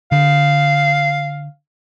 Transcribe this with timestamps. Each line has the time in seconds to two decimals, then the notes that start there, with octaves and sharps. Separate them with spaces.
0.12 D3 F5